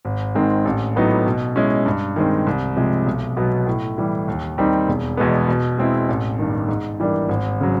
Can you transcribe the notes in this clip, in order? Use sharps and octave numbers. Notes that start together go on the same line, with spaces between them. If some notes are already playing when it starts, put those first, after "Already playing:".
G#1
G#2 D#3 G#3 C4
A1
A2 F#3 B3 D#4
B2
G#3 C#4 E4
G2
D#3 G#3 C4
C2
C3 F3 G#3
B1
B2 F#3 B3
A2
E3 G3
D#2
D#3 G3 C4 D#4
E1
E2 B2 G#3 B3
B2
G#3 C4 E4
A1
G2 D#3
G#2
E3 G3 A#3 D4
G#1
C#3 F#3